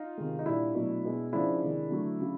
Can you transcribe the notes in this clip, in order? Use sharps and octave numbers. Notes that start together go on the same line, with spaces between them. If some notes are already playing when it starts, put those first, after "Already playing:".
Already playing: D#4 F4
C3 D#3 G#3
D#4
A#2 G3 D4 E4
B2 F#3 A3
B2 G#3
C#3 F3 G#3 D4 E4
C3 D#3 G#3
D3 F#3 A3
C#3 F#3